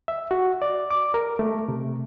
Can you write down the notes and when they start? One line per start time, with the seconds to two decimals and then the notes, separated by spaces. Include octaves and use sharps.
0.08 E5
0.31 F#4
0.62 D5
0.91 D6
1.14 A#4
1.39 A3
1.68 C3